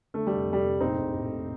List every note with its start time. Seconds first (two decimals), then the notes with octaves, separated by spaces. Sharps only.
0.14 D3 A3
0.27 F1 G3
0.48 F1
0.53 G3
0.64 F1
0.80 A#1 C4 D#4
0.98 A#1
1.14 A2
1.31 A2